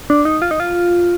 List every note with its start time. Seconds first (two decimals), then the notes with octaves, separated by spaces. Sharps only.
0.10 D4
0.25 D#4
0.42 F4
0.51 D#4
0.60 F4